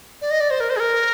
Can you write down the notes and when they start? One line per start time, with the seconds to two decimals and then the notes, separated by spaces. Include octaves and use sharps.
0.21 D5
0.31 D#5
0.41 D5
0.51 C5
0.60 A#4
0.70 C5
0.76 G#4
0.80 A#4